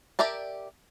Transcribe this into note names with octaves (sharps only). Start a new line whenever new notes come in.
G4 A#4 D5 E5 A5